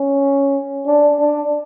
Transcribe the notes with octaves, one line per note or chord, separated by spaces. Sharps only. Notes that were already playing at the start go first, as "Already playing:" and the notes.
Already playing: C#4
D4
D4